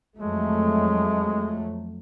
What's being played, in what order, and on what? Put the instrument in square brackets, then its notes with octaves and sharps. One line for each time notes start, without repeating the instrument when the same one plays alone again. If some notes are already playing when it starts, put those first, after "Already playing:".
[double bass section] F2 F#3 A3 [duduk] G#3